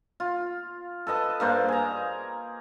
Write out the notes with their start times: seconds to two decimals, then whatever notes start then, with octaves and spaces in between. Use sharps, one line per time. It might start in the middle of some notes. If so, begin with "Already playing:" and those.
0.20 F4
1.07 A4 B4 D#5 A5
1.40 G2 A#3 C5 A5
1.68 G#4 A#5